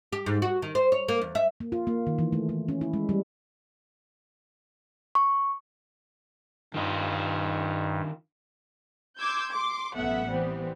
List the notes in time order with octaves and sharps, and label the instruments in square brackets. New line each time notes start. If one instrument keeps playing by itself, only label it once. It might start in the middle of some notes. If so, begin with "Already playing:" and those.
[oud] G4
G#2
F#4
D#3
C5
C#5
A#3
E2
E5
[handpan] A#3
F4
A#3
D#3
E3
A3
A3
C#4
E4
G#3
G3
[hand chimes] C#6
[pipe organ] G2 [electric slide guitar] D#3 F4 D#5
[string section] C6 D6 E6 G6 G#6
C6 D6
A1 F#3 A3 B3 E5 F#5
E3 G3 B3 C4